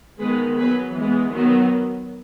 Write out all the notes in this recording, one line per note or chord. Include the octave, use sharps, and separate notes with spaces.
D#3 G#3 B3 G#4 B4
F#3 B3 G#4 B4
E3 G#3 B3
D#3 F#3 B3